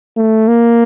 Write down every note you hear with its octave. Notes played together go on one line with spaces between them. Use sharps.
A3
A#3